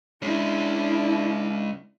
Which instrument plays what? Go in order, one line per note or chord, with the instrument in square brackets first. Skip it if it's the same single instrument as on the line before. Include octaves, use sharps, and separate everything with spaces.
[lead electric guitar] G#3 C#4 [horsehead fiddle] D4 E4